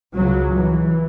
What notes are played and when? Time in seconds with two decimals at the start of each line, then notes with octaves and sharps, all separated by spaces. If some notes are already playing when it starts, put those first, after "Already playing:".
0.15 C#2 C#3 F#3
0.56 E3